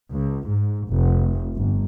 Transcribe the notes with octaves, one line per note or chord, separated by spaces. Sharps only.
C#2
G#2
F1
G1